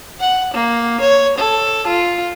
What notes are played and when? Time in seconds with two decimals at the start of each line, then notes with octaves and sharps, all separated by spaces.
0.19 F#5
0.55 A#3
1.02 C#5
1.39 A4
1.89 F4